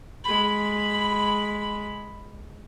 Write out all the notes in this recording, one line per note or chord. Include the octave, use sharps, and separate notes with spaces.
G#3 B5